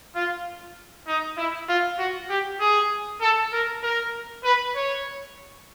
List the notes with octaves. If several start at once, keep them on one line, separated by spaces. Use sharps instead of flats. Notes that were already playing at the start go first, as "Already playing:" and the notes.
F4
D#4
E4
F4
F#4
G4
G#4
A4
A#4
A#4
B4
C#5